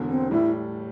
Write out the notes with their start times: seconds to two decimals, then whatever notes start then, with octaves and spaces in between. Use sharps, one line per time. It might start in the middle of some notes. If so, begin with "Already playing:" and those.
Already playing: E1 E2 D3
0.09 C4
0.31 A2 G3 E4